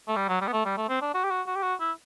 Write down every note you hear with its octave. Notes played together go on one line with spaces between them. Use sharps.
A3
G3
F#3
G3
B3
A3
G3
A3
C4
D4
F#4
G4
F#4
F#4
G4
F#4
E4